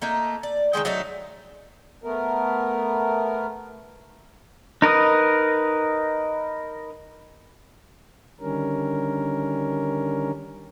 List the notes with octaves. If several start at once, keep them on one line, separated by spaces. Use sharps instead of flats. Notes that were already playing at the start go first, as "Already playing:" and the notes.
A3 A#3 D#4
D5
D#3 F3 G#3 G5
F#3 A3 D4 D#4
A3 B3 A#4
D#4 A#4 B4 D#5
D3 D#3 G3 C#4 A#4